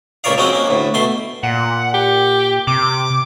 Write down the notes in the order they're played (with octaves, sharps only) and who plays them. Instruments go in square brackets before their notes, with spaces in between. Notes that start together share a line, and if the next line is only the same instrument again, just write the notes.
[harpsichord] C#2 A#2 A#3 C#5 D5 F5
F3 F#3 G#3 C4 C#4 F#4
A#3 C#4
D2 A2
B2 A3 C6
[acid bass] A#2 [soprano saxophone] F#5
[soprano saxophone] G4
[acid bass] C3 [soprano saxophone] D6